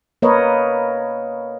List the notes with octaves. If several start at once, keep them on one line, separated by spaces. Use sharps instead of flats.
A#3 A#4 B4 C#5 D#5